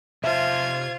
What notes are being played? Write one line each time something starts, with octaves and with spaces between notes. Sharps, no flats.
C3 F4 C5 E5 G#5 A5 G#6